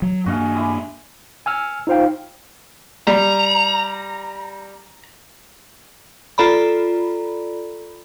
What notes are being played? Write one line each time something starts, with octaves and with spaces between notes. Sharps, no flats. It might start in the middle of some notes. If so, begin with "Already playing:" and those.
F#3
G2 A#3 D4 F#4 G#4 F5
G3 G#3 E4
G#5 E6 F6
D#4 F4 C5 F5 G5
G3 A#5
F4 A4 D5 A#5 B5